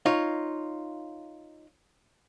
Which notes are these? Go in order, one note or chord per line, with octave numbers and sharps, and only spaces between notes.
D#4 F4 C#5